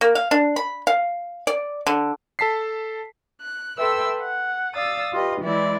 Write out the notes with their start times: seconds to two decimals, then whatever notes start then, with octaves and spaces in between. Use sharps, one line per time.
0.01 A#3
0.15 F5
0.31 D4
0.56 B5
0.87 F5
1.47 D5
1.87 D3
2.39 A4 A5 B6 C7
3.41 F#6
3.78 A4 B4 E5 G5 C6 E6
4.19 F#5
4.74 D5 F5 D#6 E6 A6
5.13 F4 G4 B4 D#5
5.43 E3 G#3 E4 D5